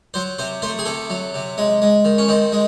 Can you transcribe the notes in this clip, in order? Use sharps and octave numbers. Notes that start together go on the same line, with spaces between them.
F#3 C5
C3 C5
A3 C5
G#4
C3 A4
F#3
C3
G#3
G#3
D#3
C#4
D#3 C4
G#3